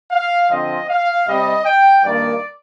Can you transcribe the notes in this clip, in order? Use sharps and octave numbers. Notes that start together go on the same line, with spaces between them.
F5
D3 F3 C4 D#5
F5
C3 G3 C4 D#5
G5
G2 D#3 A#3 D5